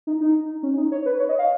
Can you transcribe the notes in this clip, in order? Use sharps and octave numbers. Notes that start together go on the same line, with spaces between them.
D#4
D#4
C#4
D#4
C#5
B4
C#5
D#5
F5